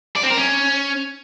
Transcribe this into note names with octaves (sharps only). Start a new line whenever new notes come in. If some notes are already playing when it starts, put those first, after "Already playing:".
D5
C4
A#4
C#4